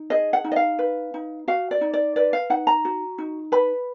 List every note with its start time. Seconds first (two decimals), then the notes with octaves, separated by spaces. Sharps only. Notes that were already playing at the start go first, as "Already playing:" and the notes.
Already playing: D#4
0.10 G#4 D#5
0.33 F#5
0.44 D#4
0.52 D#5
0.56 F5
0.79 B4
1.14 D#4
1.48 F#4 F5
1.71 D5
1.81 D#4
1.93 D5
2.16 B4 D5
2.33 F5
2.50 D#4 F#5
2.67 A#5
2.85 F#4
3.18 D#4
3.52 B4 B5